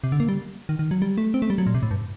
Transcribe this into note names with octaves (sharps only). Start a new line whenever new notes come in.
C3
D3
A#3
G3
D#3
D#3
F#3
G3
A3
C4
A3
G3
F#3
A#2
C3
A2
G2